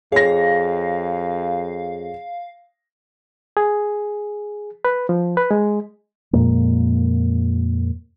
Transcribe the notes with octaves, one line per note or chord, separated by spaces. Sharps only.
F2 G#4 C#5 F5 A#6
G#4
B4
F3
B4
G#3
F2 A#2 G#3 A#3